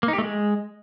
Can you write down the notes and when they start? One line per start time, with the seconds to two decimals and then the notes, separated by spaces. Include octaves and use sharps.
0.03 A#3
0.08 D#4
0.13 G4
0.18 A3
0.24 G#3